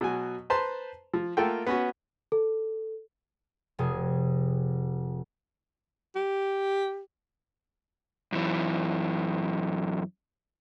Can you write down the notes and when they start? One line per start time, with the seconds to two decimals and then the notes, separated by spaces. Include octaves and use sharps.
0.01 B2 F#3 G#5
0.50 B4 C5 A5 A#5 C6
1.13 F3
1.37 A3 A#3 F4 A4 F#5 G5
1.67 B3 C#4 F#4
2.32 A4
3.79 F1 C3 G#4
6.15 G4
8.32 F#2 E3